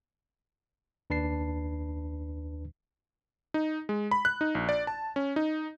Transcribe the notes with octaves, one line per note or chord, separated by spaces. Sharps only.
D#2 D4 B4 A5 C7
D#4
G#3
B5
F#6
D#4
A#1
D5
A5
C#4
D#4